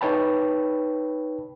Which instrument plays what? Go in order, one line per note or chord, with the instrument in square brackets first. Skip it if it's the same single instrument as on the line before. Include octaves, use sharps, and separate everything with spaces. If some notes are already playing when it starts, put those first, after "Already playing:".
[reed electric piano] D#4 B4 C#5 G5 A5 B5